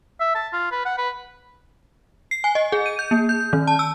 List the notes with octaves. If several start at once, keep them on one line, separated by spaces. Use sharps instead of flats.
E5
A5
F4
B4
F#5
B4
C7
G#5
D#5
G#4
D#7
G6
A#3
G6
D#3
A5
E6